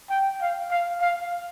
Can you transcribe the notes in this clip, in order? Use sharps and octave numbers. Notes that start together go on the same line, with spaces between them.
G5
F5
F5
F5